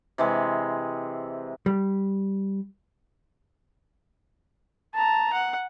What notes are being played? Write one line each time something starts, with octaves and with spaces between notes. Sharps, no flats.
C3 E3 G#3
G3
A5 A#5
F#5